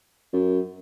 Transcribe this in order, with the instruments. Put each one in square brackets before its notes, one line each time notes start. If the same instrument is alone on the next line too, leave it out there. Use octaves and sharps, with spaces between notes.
[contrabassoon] F#2